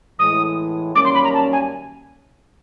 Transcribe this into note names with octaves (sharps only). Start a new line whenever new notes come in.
A2 E3 G#3 D#6
F#2 D#3 G3 A#3 C#4 D6
C6
B5
A#5
A5
G#5